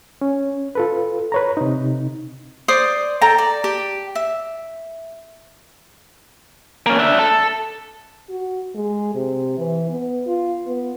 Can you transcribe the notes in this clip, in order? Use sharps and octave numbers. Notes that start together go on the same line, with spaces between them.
C#4
F4 A4 B4
B4 C#5 A#5
C3 D#4
C5 D5 D6 D#6
A4 G5 A#5
D5
G4 G5 A5
E5
A#3 C#4
D4 E5
A4
F#4
G#3
C3
E3
B3
F4
B3